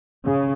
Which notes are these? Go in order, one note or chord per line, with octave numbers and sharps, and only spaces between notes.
C#3